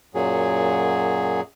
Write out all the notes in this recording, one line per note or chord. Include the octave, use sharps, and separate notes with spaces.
F#2 A#2 F#3 G#4